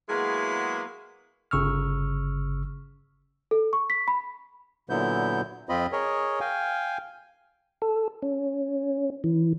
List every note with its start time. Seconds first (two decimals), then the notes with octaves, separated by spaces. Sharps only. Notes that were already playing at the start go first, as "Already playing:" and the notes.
0.09 F#3 G#3 A#3 B3 E4 G#4
1.51 G1 C#3 C#6 E6 F6
3.51 A4
3.73 C#6
3.90 B6
4.08 B5
4.90 A#2 D3 F#3 B3 E4 G6
5.69 F2 C4 F4 D#5 B5
5.92 G#4 A#4 C#5 D#5
6.40 F5 G5 G#5
7.82 A4
8.22 C#4
9.24 E3